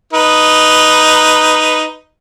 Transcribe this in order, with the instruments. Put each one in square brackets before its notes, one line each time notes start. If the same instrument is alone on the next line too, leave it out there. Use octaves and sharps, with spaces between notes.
[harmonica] D#4 B4